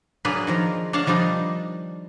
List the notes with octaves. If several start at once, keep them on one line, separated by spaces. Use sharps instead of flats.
F#3 A#3 D4 G#4 B4
D#3 F3 A#4
D4 C#5 F5 F#5 A5
D#3 F3 G3 D4 D#4